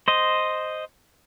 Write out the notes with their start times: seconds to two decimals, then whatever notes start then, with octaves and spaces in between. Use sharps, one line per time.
0.08 C5 D#5